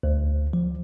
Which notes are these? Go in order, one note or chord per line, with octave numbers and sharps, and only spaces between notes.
D2
F3